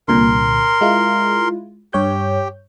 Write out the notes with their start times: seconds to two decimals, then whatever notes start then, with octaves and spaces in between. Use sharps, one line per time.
0.08 C2 A#2 D3 A#4 C6
0.81 G#3 E4 F4
1.93 G2 G4 C#5 G6